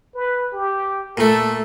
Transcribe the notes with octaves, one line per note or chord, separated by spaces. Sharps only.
B4
G4
A#2 A3 A4